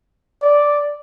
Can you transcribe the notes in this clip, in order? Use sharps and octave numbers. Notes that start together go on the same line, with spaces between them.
D5